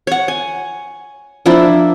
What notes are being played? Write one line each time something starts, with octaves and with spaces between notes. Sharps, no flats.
C#5 F#5
G#5
F3 A#3 D4 E4